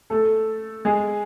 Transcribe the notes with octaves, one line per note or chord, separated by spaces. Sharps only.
A3 A4
G#3 G#4